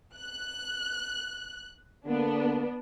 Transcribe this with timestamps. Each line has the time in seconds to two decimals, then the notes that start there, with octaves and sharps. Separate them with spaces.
0.17 F#6
2.06 D3 A#3 B3 D4